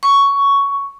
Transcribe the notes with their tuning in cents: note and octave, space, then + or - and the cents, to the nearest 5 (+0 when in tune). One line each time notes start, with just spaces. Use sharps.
C#6 +10